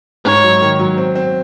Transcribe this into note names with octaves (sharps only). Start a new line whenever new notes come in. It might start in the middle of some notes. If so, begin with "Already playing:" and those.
G#2 C#5
F#3
D#3
F#3
C4
C4